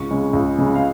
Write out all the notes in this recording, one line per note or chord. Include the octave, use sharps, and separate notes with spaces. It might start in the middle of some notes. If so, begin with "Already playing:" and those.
Already playing: C#2 C#6
C#3 G#3 C#4
C#2
C#3 G#3 C#4
F5